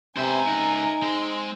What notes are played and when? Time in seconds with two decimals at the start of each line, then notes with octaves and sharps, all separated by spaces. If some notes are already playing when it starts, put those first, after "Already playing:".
0.17 C#2 C3 B4 C5 E5 G#5 A#5
0.48 D#4 A#4 F#5
1.03 G#3 C4 C6